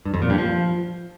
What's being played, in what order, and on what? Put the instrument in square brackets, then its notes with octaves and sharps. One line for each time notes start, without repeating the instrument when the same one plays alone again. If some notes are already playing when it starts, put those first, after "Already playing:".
[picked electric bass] G2
F2
A#2
G2
F3